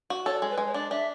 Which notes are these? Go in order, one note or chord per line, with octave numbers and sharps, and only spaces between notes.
F#4
A4 C#5
D5
G#3 C#5
B4
G#3
C#5
D4 D5
D4 E5